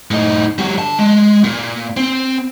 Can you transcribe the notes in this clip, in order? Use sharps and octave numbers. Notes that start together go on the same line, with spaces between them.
A2 D#4
G3 F#4
D3 A5
G#3
A#2
C4